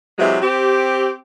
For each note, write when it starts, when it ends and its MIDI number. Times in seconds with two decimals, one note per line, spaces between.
0.19 0.37 48
0.19 0.37 52
0.19 0.37 54
0.19 0.37 56
0.42 1.14 60
0.42 1.14 67